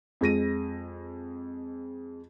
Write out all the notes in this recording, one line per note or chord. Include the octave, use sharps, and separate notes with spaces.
F2 G#3 A#6 D#7